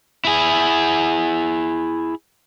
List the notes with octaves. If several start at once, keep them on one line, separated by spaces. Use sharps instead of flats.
E4 G#4